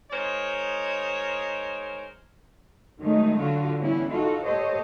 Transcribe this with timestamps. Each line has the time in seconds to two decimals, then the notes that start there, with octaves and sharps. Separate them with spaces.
0.11 G#3 D#4 A#4 C5 C#5
3.01 D#3 F#3 G#3 A3 D#4
3.38 D3 D4 F4 F#4
3.80 E3 G3 B3 C#4 E4
4.11 D#4 F4 F#4 A4
4.46 A#3 G4 A4 C5 C#5 D#5